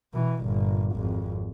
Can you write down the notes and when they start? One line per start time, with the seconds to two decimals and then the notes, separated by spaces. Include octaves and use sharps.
0.14 B2 E3
0.44 G1 A#2
0.95 G#1 F2